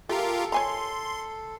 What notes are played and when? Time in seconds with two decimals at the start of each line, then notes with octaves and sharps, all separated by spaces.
0.09 A3 F4 G4 A4 A#4
0.52 C#5 G#5 A#5 C6